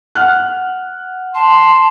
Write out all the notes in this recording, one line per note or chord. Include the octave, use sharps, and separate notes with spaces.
F#5 F6 F#6
A5 C6